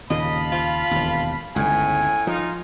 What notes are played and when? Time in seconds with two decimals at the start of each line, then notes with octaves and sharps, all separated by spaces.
0.10 D#2 A#2 C#3 D#5 F5 A5 B5
0.52 F4
0.91 E1 D#2
1.56 G1 C#2 A2 G#5
2.27 F3 D#4 F4